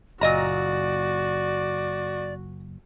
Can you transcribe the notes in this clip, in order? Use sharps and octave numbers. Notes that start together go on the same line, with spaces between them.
F#1 A#2 F#4 D5 D#5 A#5